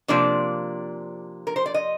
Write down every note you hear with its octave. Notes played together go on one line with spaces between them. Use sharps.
C3 F3 A#3 D4 D5
A#4
C5
D5
D#5